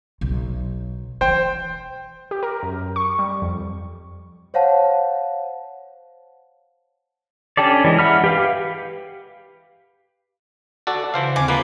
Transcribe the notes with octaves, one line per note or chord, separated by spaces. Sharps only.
B1
E3 C5 G5
G4
A#4
F#2
C#6
G3
F2
C5 C#5 F5 F#5 A5
C#4 D4 G4 A4 D5
E3 G#3
E5 F#5 B5 F6
G4 B4 F5
F#4 A4 D5
C#3 E3 C5 F5
D#2 D3 C4 G#5 D6
F3 A#3 B4 C5